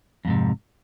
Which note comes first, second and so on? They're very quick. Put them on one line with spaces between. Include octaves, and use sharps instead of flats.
F2 G#2 C3